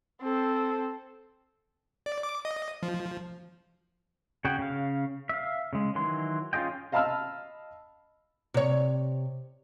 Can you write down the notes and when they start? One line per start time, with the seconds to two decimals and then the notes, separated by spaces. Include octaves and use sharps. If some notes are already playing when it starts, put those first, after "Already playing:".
0.20 C4 A4
2.06 D5
2.23 D6
2.45 D#5
2.83 F3
4.45 C#3 F#4 G#4 G5
4.59 C#3 F5
5.29 E5 F5
5.73 C#3 G#3
5.95 D#3 E3 F#3 C6
6.53 C#4 F4 G#4 D#5 G5
6.92 D#5 F5 A5 B5 E6 F6
8.54 C3 C#5